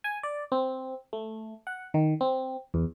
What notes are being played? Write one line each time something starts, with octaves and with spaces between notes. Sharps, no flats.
G#5
D5
C4
A3
F#5
D#3
C4
E2